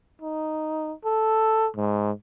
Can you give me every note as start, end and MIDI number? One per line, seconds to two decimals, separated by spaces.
0.22 0.92 63
1.05 1.68 69
1.76 2.11 44